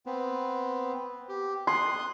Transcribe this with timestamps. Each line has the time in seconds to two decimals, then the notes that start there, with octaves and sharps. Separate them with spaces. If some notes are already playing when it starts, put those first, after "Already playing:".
0.06 B3 C4
1.29 G4
1.67 C6 D#6 F#6